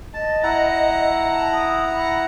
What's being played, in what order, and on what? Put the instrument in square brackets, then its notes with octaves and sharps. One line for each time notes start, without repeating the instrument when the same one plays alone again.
[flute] D#5 [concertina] A5
[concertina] E4 F#5 A#5
[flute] A5
D#6
B5